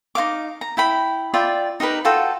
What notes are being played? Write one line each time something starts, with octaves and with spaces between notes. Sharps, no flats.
D#4 C5 F5 D6
A#5
E4 G5 B5
F4 D5 E5 G5
D#4 G4 A#4 B4
F4 F#4 A4 G5